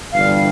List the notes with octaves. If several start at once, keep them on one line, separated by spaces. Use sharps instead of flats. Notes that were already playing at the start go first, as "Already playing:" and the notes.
G1 G2 E3 G3 D4 F5